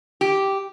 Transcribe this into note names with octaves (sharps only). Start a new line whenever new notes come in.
G4